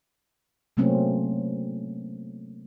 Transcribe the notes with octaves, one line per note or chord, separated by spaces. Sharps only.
C3 F#3 A3 A#3 C4 C#4